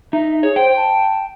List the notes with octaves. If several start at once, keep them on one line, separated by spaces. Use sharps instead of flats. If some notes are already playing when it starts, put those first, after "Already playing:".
D#4 E5
G#4 C#5
C5 G5
A5